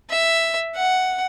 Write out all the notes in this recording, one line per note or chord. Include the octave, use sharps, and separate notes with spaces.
E5
F#5